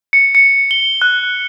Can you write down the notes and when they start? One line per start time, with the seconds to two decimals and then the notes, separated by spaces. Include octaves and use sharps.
0.13 C#7
0.35 C#7
0.71 G7
1.02 F#6